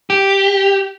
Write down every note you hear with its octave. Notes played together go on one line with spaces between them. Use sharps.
G4